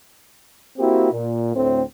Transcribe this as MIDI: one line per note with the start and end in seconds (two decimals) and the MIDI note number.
0.78 1.10 58
0.78 1.10 60
0.78 1.10 64
0.78 1.10 66
0.78 1.10 67
1.12 1.53 46
1.54 1.82 38
1.54 1.82 45
1.54 1.82 60